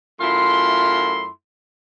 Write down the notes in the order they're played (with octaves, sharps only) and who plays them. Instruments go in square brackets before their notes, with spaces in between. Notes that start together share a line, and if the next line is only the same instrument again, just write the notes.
[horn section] F#2 A3 E4 F4 C6